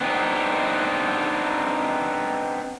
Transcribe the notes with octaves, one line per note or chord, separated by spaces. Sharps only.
B3 C4 D4 D#4